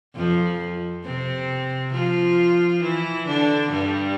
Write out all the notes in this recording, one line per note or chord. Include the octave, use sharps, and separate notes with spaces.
F2 F3
C3 C4
F3 F4
E3 E4
D3 D4
G2 G3